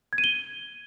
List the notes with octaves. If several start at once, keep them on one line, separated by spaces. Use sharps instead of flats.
G#6
D#7
G7